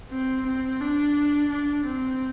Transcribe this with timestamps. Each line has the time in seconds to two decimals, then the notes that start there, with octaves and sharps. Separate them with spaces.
0.12 C4
0.47 C4
0.81 D4
1.50 D4
1.85 C4